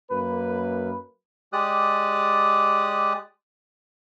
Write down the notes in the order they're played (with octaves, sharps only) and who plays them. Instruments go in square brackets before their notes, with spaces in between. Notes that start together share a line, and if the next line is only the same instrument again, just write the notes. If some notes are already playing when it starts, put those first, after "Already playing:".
[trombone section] F#2 A#3 B4
[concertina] G#3 G4 D5 D#6 F#6